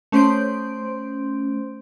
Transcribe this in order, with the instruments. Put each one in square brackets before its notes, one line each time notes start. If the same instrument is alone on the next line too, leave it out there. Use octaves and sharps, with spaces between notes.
[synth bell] A3 C#4 C5 C6 G6 D7